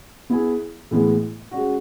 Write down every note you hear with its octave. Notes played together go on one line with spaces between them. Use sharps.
B3 E4 G#4
A2 E3 G#3 B3
G#3 C#4 F#4